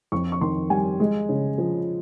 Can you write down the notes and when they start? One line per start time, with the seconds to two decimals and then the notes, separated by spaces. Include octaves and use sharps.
0.12 F2 C#6
0.32 C#6
0.41 D#3 C6
0.70 G3 G#5
1.00 G#3
1.29 C#3
1.58 F3